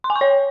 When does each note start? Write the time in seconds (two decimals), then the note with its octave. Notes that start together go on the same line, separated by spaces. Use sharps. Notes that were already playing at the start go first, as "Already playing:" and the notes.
0.04 C6
0.10 G#5
0.16 C#6
0.21 C#5